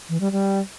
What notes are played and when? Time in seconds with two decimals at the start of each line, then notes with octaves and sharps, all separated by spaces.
0.09 E3
0.21 G3
0.32 G3